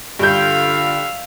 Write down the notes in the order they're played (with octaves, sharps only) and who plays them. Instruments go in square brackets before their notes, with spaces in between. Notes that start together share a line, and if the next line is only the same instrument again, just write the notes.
[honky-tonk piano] G2 G6 [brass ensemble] D3 F4 [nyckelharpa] E5 F5